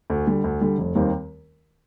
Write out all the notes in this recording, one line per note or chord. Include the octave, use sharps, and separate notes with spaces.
D2
D3 G3
D2
D3 G3
F1
D#2 D#3 G3 C4